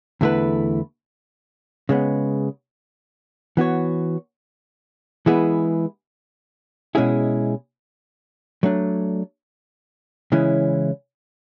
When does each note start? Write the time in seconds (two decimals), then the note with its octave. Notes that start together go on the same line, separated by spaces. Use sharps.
0.21 E2 D3 A3 E4 B4
1.89 C#3 G#3 B3
3.57 E3 B3 F#4 C#5
5.26 E3 G#3 B3 E4 G#4
6.95 B2 G#3 C#4 E4 G#4
8.63 F#3 A3 D4
10.32 C#3 E3 G#3 C#4 E4